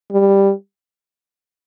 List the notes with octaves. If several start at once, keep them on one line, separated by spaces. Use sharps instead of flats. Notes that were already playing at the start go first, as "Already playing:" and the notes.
G3